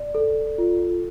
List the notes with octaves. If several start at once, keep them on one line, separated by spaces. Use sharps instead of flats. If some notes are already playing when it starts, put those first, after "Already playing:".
Already playing: D5
A4
F4